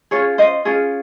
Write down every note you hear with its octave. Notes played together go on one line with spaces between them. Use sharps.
C#4 F4 G#4 C#5
C5 D#5
C#4 F4 G#4